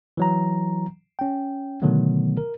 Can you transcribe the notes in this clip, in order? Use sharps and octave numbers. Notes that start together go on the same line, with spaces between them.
E3 F#3 A#5
C#4 G5
B2 D3 D#3 F#3 A3 B3
A#4